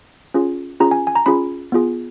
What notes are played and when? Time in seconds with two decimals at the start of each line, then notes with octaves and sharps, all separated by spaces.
0.34 C#4 F4 G#4
0.80 C#4 F4 G#4 A#5
0.91 G#5
1.07 G#5
1.15 A#5
1.26 C#4 F4 G#4 B5
1.72 B3 F4 G#4